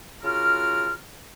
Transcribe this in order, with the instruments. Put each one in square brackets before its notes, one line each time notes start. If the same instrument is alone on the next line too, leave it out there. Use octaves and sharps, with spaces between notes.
[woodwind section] C#3 F4 F#4 A#4 F6